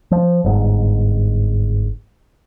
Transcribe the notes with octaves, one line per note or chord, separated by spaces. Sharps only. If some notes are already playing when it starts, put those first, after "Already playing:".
F3
G1 G#2